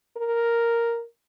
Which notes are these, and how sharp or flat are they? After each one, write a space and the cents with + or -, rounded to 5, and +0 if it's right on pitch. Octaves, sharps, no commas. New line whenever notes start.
A#4 +0